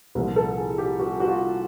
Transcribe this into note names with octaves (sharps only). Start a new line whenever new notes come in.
C2 A#2 F3
A4
G#4
G4
F#4
F#4
F4